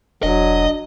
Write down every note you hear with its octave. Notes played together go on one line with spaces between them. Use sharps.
E1 F#3 D4 D#5